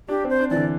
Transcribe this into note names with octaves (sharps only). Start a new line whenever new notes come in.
D4 G4
C4
C5
D4
E3 D5
D3